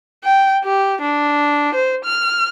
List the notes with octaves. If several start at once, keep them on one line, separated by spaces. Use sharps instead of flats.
G5
G4
D4
C5
F6